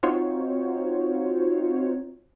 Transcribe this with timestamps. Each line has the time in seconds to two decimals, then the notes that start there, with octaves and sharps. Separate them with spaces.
0.03 C4 D#4 F4 F#4 C5 C#5